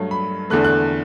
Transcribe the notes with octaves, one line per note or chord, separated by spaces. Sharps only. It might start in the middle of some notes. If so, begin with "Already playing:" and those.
Already playing: G2 F#3 A3
B5
E2 D3 A3 F#6
F#6